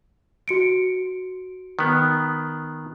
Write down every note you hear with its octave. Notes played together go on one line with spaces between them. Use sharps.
F#4 C#7 D7
D#3 B3